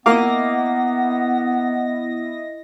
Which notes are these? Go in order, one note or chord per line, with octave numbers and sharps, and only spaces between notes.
A#3 B3 E4 D#5 F5 F#5 D6 A#6